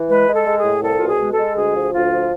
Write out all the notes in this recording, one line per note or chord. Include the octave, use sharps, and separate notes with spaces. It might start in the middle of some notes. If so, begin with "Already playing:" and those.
Already playing: E3
G#3 B4
G#3
A4
G#3
G#4
A2
C2 A4
F4
B2
G#4
G#3
A4
G#3
D2 G#4
F3
D2 F4
F3